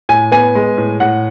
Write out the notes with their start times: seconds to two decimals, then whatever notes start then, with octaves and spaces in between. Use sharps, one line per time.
0.09 A2 G#5
0.32 B3 G#5
0.55 G#3
0.78 A2
1.00 A2 F#5